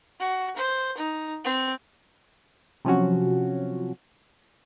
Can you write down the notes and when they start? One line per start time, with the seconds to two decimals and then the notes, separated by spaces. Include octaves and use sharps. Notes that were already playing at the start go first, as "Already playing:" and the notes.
0.20 F#4
0.56 C5
0.97 D#4
1.44 C4
2.85 C3 F3 F#3 C#4 F#4